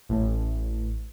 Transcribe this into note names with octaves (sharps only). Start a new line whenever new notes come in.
A1 A2